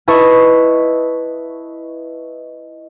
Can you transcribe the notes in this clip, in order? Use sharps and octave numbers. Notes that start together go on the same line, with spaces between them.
E4 B4 D#5 E5 A5 C#6